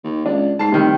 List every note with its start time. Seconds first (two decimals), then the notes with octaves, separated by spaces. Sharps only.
0.04 D#2
0.26 C#2 D4
0.59 G#2 A5 C7
0.72 F1 C3 D#3 G3